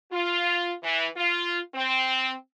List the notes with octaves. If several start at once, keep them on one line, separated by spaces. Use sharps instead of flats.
F4
E3
F4
C4